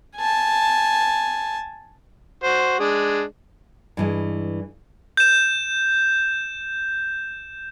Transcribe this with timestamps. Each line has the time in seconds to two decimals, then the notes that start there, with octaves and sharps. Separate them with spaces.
0.17 G#5 A5
2.44 F#4 C5
2.80 G#3 D4 G#4
3.97 G2 E3 G#3
5.17 G6 E7